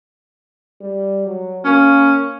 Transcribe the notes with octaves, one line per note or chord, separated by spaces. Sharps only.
G3
F#3
A#3 C#4